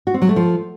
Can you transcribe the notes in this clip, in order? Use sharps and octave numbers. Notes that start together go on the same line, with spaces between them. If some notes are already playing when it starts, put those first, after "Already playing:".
F#4
C4
F#3
A3
F3